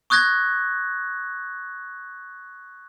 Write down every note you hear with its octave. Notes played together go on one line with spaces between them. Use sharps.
C#6 D#6 F#6 G#6 A#6